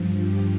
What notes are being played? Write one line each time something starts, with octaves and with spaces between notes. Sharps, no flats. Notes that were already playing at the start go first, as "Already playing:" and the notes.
Already playing: G2 F3
G4